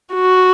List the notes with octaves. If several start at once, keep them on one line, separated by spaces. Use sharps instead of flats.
F#4